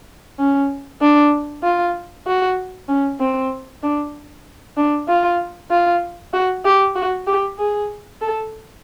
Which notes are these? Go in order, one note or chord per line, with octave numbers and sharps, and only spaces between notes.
C#4
D4
F4
F#4
C#4
C4
D4
D4
F4
F4
F#4
G4
F#4
G4
G#4
A4